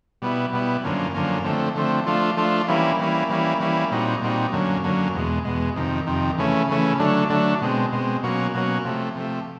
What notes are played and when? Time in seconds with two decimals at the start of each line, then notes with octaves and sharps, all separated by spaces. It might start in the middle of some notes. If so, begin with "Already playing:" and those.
0.22 B2 G3 B3 E4
0.53 B2 G3 B3 E4
0.84 F#2 D3 F3 A#3 C#4
1.14 F#2 D3 F3 A#3 C#4
1.44 D3 F3 A3 C4
1.76 D3 F3 A3 C4
2.06 F3 A3 D4 F4
2.37 F3 A3 D4 F4
2.68 E3 G3 A#3 C#4 E4
2.99 E3 G3 A#3 C#4 E4
3.29 E3 G3 A#3 C#4 E4
3.60 E3 G3 A#3 C#4 E4
3.91 A#2 G3 C4 D#4 F#4
4.22 A#2 G3 C4 D#4 F#4
4.52 F#2 D3 F#3 A#3 C#4
4.84 F#2 D3 F#3 A#3 C#4
5.14 E2 B2 G#3
5.45 E2 B2 G#3
5.76 F2 C3 D#3
6.07 F2 C3 D#3
6.38 C#3 E3 A3 C#4
6.69 C#3 E3 A3 C#4
6.99 D3 F#3 A3 D4
7.30 D3 F#3 A3 D4
7.62 B2 G#3 C4
7.92 B2 G#3 C4
8.23 B2 F#3 A#3 C#4 F#4
8.54 B2 F#3 A#3 C#4 F#4
8.85 C3 F3 A3
9.16 C3 F3 A3